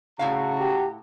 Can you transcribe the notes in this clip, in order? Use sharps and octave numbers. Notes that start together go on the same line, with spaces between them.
A2 C#3 E4 F#4 F5 A5 A#5
G4